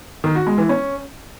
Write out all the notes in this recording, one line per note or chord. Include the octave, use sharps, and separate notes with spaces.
D#3
F#4
G#3
E3
C#4